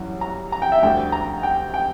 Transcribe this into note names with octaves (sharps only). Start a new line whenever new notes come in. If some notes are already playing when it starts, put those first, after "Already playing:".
Already playing: F#2 E3 G3
A#5
A#5
G5
E5
D2 D3 G3 G5
A#5
G5
G5